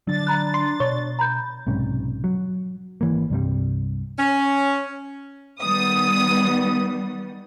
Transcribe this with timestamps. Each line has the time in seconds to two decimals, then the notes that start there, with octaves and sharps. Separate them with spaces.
0.07 D3 F#3 D4 A6
0.27 A#5 B5 F#6
0.54 C6
0.80 B2 C#5
1.19 A#5 B5 G6
1.67 B1 G#2 C3 C#4
2.24 F#3
3.01 G#1 E3 A#3
3.30 C2 G2 C3 G3
4.18 C#4
5.61 D#3 G3 B3 D#6